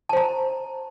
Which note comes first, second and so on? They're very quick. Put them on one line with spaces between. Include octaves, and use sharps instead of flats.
A5 C5 A#5